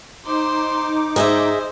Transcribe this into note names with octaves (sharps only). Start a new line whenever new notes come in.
D#4 C5 C6 D6
G#2 G#4 C5 D#5 E5